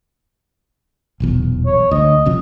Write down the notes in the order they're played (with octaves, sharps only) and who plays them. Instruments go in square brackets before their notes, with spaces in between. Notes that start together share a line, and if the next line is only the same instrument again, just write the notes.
[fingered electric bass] D#1 B1 E2
[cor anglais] C#5
[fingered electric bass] D2 [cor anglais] D#5
[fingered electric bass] F#1 C3 F3